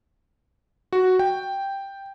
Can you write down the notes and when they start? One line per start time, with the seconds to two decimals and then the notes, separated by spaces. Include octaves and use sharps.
0.93 F#4
1.19 G5